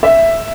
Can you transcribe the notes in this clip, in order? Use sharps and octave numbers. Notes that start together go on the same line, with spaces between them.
E5